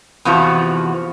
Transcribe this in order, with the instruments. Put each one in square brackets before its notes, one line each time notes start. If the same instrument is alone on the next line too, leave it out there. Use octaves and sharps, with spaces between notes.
[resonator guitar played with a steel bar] E2 C3 F3 F#4